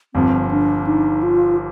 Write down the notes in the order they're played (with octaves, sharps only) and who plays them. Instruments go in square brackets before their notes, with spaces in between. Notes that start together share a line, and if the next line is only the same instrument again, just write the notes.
[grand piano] G1 G2 F3 [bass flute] C4
[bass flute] D4
D#4
F4